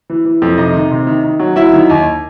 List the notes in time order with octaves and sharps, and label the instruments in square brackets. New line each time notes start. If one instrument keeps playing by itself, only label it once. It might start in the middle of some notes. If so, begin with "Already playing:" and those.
[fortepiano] E3
E3
F2
C3 D#4 D#5
D#3
C3
D#3
D#3
F#3
F#3 E4 E5
D#3
D#2